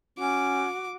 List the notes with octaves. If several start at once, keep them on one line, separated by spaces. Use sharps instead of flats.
C#4 F#4 D6